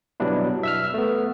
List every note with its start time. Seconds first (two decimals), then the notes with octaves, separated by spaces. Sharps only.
0.20 B2 F#3 G3 B3 D4 E4
0.63 E5 E6 F6
0.94 A3 B3